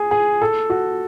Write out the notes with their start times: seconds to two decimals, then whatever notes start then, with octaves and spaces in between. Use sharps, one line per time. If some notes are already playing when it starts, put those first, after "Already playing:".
Already playing: G#4
0.11 G#4
0.41 A4
0.70 F#4